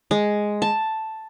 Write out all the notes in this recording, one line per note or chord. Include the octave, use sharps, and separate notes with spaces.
G#3
A5